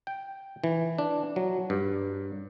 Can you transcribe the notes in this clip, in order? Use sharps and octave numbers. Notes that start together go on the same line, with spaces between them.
G5
E3
D4
F#3
G2